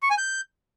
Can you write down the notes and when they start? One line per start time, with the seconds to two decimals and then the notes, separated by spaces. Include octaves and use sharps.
0.03 C#6
0.10 G#5
0.18 G6